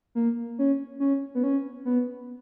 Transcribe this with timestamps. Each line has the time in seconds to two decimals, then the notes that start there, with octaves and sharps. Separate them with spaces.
0.15 A#3
0.59 C#4
1.00 C#4
1.35 B3
1.43 C#4
1.85 B3